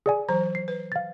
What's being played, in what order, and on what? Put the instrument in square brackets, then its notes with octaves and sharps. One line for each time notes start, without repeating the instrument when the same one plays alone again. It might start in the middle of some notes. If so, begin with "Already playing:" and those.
[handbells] G#4 D5 G#5
[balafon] E3 F#3 C5 [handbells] A#5
[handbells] C7
[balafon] B4
[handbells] F5 A6